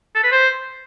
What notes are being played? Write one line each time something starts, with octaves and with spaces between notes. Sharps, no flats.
A4
B4
C5